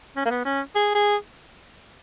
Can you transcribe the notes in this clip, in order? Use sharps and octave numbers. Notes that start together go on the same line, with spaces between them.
C#4
A#3
B3
C#4
G#4
G#4